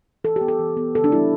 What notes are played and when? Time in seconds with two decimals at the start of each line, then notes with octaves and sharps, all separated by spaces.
0.24 E3 A4
0.36 G4
0.41 B3
0.48 A4
0.59 E3
0.77 B3
0.95 C#3 A4
1.04 D4
1.12 B3 E4
1.15 G3